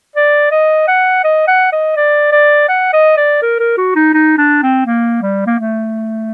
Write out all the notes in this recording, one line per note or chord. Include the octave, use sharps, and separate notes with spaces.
D5
D#5
F#5
D#5
F#5
D#5
D5
D5
F#5
D#5
D5
A#4
A#4
F#4
D#4
D#4
D4
C4
A#3
G3
A#3
A3